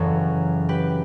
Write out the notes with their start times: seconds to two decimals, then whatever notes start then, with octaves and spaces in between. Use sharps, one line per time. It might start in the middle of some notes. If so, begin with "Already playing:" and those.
Already playing: F#1 F#2 E3 A4 C#5
0.69 G4 B4